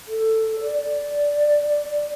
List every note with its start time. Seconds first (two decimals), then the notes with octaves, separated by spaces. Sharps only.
0.07 A4
0.61 D5